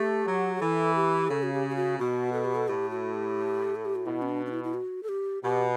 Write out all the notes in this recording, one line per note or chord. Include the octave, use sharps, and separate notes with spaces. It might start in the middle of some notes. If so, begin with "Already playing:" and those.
Already playing: A3 G4
F#3
G4
E3 A4
G4
C#3 A4
F#4
G4
G4
F#4
B2 F#4
A4
G4
A4
A2 G4
F#4
G4
A4
G4
F#4
B2 E4
C#4
D4
D4
E4
E4
F#4
A4
G4
B2 G4